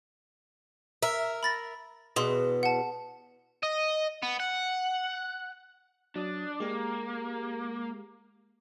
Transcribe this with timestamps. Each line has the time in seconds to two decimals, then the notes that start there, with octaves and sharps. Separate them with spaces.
1.02 A#4 E5
1.43 B5 A6 A#6
2.16 E2 B2 G#4 C6
2.63 F#5 A5
3.63 D#5
4.23 B3
4.40 F#5
6.16 F#3 D4 D#6
6.60 G#3 A#3 G4